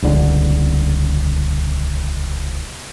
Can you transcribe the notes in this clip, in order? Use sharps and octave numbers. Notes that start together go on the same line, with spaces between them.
D#1 C#2 D3